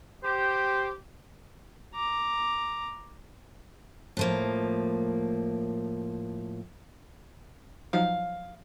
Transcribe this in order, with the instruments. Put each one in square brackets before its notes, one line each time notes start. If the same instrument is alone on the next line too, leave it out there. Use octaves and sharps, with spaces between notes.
[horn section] G4 [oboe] C5
[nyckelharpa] A#5 D6
[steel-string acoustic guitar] A2 F3 A#3
[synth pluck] F3 F#3 D#4 [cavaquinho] F5